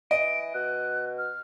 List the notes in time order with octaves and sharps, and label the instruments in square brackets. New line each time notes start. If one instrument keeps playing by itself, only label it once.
[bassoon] E3 [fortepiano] D#5 [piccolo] D7
[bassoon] B2 [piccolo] F#6
[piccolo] F6